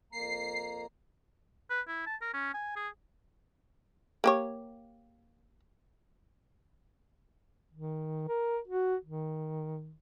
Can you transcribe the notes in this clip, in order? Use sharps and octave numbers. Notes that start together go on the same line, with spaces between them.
F2 A#3 A#5 C7
B4
E4
A5
A#4
C#4
G#5
G#4
A#3 G4 C#5
D#3
A#4
F#4
D#3